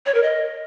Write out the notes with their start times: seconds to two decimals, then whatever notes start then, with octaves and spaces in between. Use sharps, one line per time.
0.06 C#5
0.15 A#4
0.23 D#5